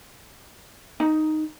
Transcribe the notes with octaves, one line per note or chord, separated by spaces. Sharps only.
D#4